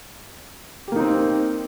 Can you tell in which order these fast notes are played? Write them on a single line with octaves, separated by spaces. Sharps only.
G4 A#3 D#4 C4